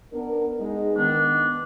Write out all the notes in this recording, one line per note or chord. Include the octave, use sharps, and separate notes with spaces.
B3 D4 A#4
G#3 B3 D#4
D#3 B3 D4